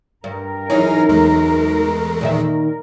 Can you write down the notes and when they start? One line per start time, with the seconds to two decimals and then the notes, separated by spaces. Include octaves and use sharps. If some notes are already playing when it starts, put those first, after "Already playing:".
0.24 G2 A#4
0.70 F#2 E3 C#4 D#4 G#4 C#5
1.09 E2 G#3 A3
2.21 A#2 D#3 E5